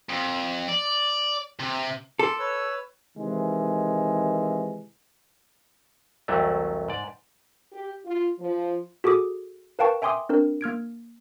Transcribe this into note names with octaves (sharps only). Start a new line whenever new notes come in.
F2
D5
C3
A4 C6 D6
B4 C#5 E6
C3 D#3 E3 G#3
C2 F2 C3 E3 F#3 A3
G#2 D5
G4
F4
F3
F#4 G#4 A4 D6 D#6
A#4 B4 F5 G5 A5 C#6
E5 G5 G#5 C6 D6 D#6
C4 D4 A#4
A#3 F6 G#6 D7